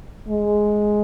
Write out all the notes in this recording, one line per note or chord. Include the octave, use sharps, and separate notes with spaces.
G#3